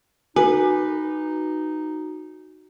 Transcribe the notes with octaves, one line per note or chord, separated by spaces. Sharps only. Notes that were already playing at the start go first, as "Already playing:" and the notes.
D#4 F#4 B4 G#5